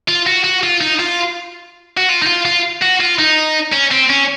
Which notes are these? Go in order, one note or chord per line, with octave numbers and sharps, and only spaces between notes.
F4
F#4
F#4
F4
D#4
F4
F#4
F4
D#4
F4
F4
F#4
F4
D#4
C#4
C4
C#4